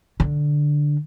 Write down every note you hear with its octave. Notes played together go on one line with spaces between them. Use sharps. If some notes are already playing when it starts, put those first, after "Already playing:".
D3